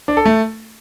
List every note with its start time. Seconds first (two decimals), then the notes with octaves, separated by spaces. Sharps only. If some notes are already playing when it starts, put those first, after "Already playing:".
0.08 D4
0.17 A4
0.26 A3